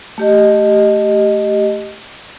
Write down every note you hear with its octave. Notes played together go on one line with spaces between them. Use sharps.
A3 G4 D#5